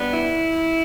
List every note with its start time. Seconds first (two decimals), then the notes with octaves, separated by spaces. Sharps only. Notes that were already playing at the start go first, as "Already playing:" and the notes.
Already playing: G3 B3 D4
0.13 E4